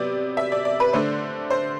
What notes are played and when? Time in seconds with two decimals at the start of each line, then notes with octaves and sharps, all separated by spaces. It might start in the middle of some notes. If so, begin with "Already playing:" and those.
Already playing: C3 F#3 B3 D5
0.37 E5
0.52 D5
0.65 D5
0.80 B4
0.93 D3 A3 D4 C5
1.50 C5